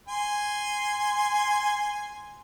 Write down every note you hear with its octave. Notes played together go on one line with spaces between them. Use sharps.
G#5 C6